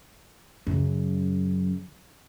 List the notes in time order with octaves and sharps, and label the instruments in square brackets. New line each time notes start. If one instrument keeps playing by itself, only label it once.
[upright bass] F#2 C#3